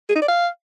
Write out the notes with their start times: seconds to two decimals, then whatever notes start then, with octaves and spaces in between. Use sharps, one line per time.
0.09 G#4
0.16 D#4
0.22 D5
0.28 F5